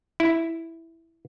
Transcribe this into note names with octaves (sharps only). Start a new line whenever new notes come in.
E4